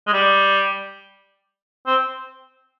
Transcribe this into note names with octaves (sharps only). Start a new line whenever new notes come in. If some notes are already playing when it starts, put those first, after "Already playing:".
G#3
G3
C4